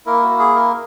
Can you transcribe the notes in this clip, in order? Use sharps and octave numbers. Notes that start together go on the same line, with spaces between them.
A#3 E4 A#4
F#4
G#4
A#4